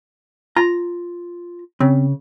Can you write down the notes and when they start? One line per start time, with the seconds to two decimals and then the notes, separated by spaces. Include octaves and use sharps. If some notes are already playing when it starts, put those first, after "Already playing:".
0.57 F4 A#5
1.80 C#3 C4